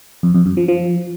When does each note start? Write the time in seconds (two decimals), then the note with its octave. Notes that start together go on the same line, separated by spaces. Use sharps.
0.23 F2
0.35 F2
0.46 F#2
0.57 F3
0.68 F3